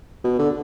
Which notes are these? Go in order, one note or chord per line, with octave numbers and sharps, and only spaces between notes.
B2
D3